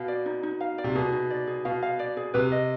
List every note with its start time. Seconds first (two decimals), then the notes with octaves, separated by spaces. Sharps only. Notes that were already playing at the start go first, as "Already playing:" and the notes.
Already playing: B2 F5
0.08 D5
0.26 D#4
0.43 D#4
0.61 F5
0.78 D5
0.84 C3
0.95 B2 G#4
1.12 D#4
1.30 D5
1.47 G#4
1.65 B2 F5
1.82 F5
1.99 D5
2.17 G#4
2.34 C3 B4
2.52 D#5